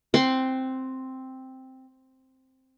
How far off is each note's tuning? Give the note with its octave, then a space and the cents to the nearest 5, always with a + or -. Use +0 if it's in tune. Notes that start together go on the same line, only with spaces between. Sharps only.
C4 +0 F#5 +30 C6 +0